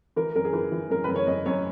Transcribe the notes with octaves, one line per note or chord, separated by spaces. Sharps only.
E3 A#4
F#2 A#4
G#4
E3
E3
F#2 A#4
F#2 B4
C#5
F#2 D#5
F#2 C#5